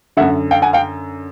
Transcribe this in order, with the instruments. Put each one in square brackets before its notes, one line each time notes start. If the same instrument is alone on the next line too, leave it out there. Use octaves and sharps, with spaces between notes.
[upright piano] F#2 D3 E5 F#5
F5 G5
F#5 G#5
F5 G5